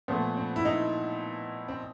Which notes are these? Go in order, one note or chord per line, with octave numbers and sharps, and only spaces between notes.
A#2 F3 A3 B3
C4
E4
D#4
C4